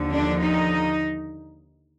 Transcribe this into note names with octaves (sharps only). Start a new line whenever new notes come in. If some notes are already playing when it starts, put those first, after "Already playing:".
Already playing: D#2 D3 F3
D4
D#4